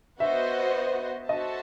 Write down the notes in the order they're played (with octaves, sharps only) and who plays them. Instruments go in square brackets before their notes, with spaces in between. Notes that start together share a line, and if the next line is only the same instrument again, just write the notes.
[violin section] B3 F#4 C5 D#5 [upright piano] E5
[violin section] F#4 A4 C5 E5 A5 [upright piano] D#5